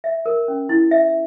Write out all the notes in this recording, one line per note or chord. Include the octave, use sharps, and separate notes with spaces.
E5
A#4
C#4
E4
E5